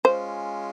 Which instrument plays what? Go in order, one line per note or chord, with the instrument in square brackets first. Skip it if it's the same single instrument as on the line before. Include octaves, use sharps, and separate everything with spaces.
[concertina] G#3 C#4 F4 [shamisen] C5